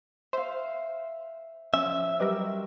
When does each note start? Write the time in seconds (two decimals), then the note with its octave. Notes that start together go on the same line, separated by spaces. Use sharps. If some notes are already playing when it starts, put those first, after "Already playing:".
0.33 C5 E5 F5
1.74 F3 C#4 E5
2.20 F#3 G3 G4 A#4 B4 D#5